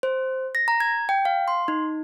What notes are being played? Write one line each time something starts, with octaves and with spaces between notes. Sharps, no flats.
C5
A#6
A#5
G#6
G5
F5
C6
D#4